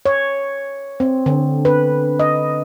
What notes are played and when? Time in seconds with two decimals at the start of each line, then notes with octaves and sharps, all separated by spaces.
0.06 C#5
1.00 C4
1.26 D3
1.65 B4
2.20 D#5